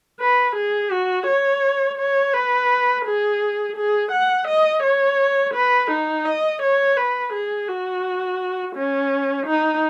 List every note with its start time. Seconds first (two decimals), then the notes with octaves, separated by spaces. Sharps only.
0.20 B4
0.56 G#4
0.91 F#4
1.27 C#5
1.98 C#5
2.33 B4
3.05 G#4
3.76 G#4
4.12 F#5
4.48 D#5
4.83 C#5
5.54 B4
5.91 D#4
6.26 D#5
6.62 C#5
6.96 B4
7.33 G#4
7.68 F#4
8.76 C#4
9.47 D#4